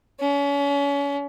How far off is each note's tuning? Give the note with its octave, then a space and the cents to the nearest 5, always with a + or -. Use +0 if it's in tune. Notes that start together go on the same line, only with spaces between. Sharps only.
C#4 +35